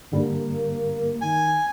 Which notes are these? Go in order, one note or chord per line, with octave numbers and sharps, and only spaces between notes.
G2 D3 G3 A#3
D#3 G#5